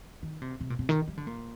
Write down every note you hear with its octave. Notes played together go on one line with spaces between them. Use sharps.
D#3
C3
C3
A#2
C3
D#3
G3
D3
A#2